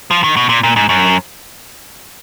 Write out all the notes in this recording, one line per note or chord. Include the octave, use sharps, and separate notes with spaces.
F3
D#3
B2
A#2
A#2
G#2
F#2